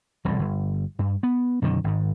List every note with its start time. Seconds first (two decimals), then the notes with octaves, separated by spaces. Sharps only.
0.25 E1 C2 A2
0.39 G1
0.99 G2
1.23 B3
1.62 F#2 B2 D3 D#3
1.84 G#1 G#2